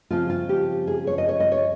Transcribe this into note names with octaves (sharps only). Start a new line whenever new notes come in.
C#3 F3 C4 F4
F4
G4
G#4
C#5
D#5
C#5
D#5
C#5